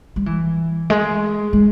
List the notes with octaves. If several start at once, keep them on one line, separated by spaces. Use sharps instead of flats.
G3
E3
G#3
G#3